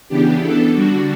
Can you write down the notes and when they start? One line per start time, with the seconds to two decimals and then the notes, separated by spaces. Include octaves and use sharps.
0.09 C#3 E3 B3 D4 G4
0.40 A4
0.72 D3 G3 D4 F#4